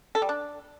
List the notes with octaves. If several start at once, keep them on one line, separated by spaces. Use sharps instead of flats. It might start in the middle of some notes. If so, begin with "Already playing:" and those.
A4
G3
D4